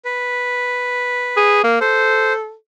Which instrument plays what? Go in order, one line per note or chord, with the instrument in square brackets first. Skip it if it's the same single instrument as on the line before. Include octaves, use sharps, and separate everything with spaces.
[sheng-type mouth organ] B4
[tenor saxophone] G#4
A#3
[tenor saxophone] A4 [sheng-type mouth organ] C5